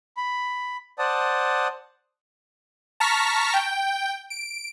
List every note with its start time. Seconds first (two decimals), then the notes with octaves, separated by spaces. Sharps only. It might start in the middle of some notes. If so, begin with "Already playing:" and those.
0.17 B5
0.99 C5 D5 F#5 A5 D#6
3.00 A5 A#5 C#6 F6 B6
3.54 G5
4.30 D7